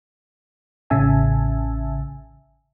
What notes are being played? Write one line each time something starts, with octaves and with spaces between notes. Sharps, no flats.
A1 C#3 E5 G#5 A5